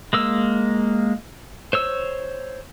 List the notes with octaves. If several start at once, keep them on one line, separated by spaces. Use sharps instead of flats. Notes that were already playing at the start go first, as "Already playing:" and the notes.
G#3 A#3 E6
C5 C#5 E6